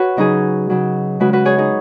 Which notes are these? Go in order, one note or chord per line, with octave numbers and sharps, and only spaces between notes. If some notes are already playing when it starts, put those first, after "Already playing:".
Already playing: F#4 B4 C#5
C#3 F#3 D#4 G#4
C#3 F#3
C#3 G#3 F#4 B4
F#4 B4
G#4 C#5
D#4 G#4